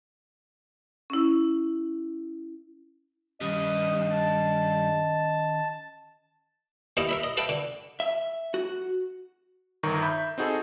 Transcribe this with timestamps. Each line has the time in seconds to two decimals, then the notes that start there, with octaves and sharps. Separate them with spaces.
1.10 C#4 E4
3.41 G2 D#3 C#4 G4 D#5 D#6
4.10 A5
6.97 D#2 D#4 E4 D#5 F5 C#6
7.09 A#4 E5 B5
7.23 D#5
7.37 A4 B4 E5 F5 G5
7.49 D3
8.00 E5
8.54 F#4
9.83 G1 D#3 A#5 C#6
10.02 E5 B5 G6
10.38 C4 D#4 F#4 G#4 A4